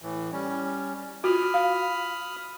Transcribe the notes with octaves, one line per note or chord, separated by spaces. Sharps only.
A2 E3
G3 C#4
F4 F#4 B5 D#6 F6
F5